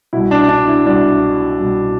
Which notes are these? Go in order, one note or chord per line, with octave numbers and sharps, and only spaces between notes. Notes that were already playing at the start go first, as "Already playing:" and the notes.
C2 B2 E4
D4
D4
E4
C2 B2 D4
C2 B2